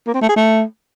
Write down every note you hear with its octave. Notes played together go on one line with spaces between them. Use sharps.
A#3
C4
A3
G#4
A3